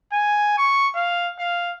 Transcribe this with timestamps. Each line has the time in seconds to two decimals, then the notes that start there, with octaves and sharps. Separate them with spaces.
0.13 G#5
0.58 C#6
0.95 F5
1.39 F5